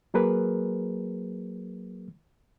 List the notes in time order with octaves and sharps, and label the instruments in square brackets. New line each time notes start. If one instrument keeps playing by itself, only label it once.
[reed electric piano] F#3 A#3 G#4 A#4 B4